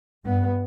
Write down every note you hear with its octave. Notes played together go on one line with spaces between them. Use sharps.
G2 B3